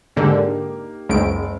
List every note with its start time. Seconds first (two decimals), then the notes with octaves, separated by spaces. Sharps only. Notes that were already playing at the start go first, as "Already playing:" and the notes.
0.16 G#2 D3 A#3 D#4 G4
1.09 F#1 C#2 D7